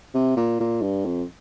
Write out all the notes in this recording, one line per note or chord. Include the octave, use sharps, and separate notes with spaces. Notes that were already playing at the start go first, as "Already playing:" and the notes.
C3
A#2
A#2
G2
F2